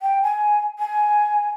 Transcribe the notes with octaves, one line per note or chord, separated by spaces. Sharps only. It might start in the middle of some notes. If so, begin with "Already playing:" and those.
G5
G#5
G#5